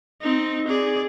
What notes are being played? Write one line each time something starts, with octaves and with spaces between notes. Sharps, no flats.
C4 D#4
G#4 D5